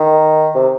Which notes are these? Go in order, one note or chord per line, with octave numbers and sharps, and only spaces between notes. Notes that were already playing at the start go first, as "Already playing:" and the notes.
Already playing: D#3
C3